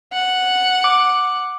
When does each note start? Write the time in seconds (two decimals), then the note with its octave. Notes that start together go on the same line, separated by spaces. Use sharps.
0.13 F#5
0.84 D6